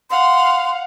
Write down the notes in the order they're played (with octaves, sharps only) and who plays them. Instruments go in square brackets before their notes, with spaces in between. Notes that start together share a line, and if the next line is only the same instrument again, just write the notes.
[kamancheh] F5 F#5 [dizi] C6